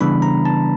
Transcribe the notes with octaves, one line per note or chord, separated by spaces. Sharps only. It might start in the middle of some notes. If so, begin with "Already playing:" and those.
C#3 E3 G3 B3 D4 B5
A#5
A5